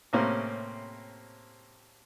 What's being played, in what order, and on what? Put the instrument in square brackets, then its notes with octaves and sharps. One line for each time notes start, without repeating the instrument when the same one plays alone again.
[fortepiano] A2 C3 A#3 C4 C#4